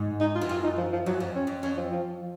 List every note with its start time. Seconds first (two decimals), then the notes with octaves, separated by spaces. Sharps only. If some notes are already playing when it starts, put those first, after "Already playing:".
Already playing: G#2
0.21 D#4
0.36 F4
0.41 F2
0.49 F#2 F4
0.64 D#4
0.78 F3
0.93 F3
1.06 F#2 F#3
1.20 F2 F3
1.35 C#4
1.47 F2
1.63 F2 C#4
1.77 F3
1.92 F3
2.20 F3